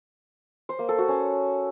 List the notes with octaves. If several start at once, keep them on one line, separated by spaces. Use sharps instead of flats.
C5
A#3
A4
F#4
C#4